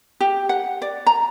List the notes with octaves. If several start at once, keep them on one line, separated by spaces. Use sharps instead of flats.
G4
F#5
D5
A#5